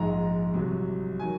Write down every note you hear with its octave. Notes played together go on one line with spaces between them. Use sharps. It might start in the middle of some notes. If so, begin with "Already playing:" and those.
Already playing: A#1 G#2 F3 G#3 A#5
C2 C3 F#3
D#3 F#3 G#5